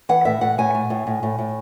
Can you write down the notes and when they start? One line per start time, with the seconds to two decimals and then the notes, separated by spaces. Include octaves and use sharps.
0.09 E3 F#5
0.25 A2 E5
0.41 A2 F#5
0.58 A2 G#5
0.75 A3
0.90 A2
1.07 A2
1.23 A2
1.39 A2